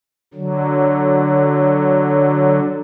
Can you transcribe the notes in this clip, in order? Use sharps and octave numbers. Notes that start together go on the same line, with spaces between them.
D3 F#3